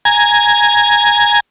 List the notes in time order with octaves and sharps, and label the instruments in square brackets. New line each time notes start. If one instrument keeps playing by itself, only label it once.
[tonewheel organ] G#5 A#5 G#6